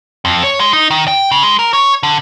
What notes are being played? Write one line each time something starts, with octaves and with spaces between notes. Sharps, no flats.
F2
C#5
G#3
D#4
D#3
G5
C#3
G#3
A#4
C#5
D3